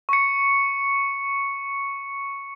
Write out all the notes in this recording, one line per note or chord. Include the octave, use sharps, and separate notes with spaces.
C#6 C#7